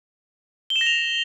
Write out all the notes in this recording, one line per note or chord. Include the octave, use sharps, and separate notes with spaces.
G7
E7
A#6
F7